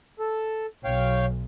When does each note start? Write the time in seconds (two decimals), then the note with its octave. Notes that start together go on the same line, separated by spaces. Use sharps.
0.20 A4
0.85 B1 C#5 F5 G5